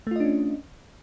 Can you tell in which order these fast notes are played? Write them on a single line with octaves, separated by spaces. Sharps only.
A3 F4 D#5 D4 C#4